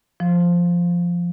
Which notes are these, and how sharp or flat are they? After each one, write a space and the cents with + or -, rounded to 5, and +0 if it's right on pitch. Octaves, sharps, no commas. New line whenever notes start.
F3 -5